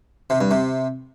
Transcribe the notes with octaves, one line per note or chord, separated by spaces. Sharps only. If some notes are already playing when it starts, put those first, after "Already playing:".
C3
G2
C3